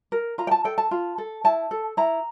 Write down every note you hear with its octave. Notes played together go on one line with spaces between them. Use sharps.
A#4
F4 A#5
G5
A5
A4 G5
A5
F4
A4
E4 A5
A4
E4 A#5